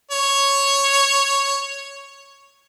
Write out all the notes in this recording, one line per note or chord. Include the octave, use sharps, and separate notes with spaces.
C#5